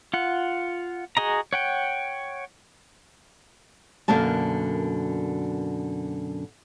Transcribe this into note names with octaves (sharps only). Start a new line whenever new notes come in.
F4 F#5
F#4 G#4 D#5 A#5
C#5 F#5 G5
F#2 B2 D3 A#3 A#4 A5